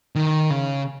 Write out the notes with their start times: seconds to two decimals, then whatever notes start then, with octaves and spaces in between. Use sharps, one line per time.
0.16 D#3
0.50 C#3